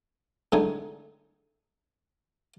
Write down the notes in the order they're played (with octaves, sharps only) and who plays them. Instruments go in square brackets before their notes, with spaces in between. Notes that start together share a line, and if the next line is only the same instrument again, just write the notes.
[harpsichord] A2 D3 G#3 D#4 G#4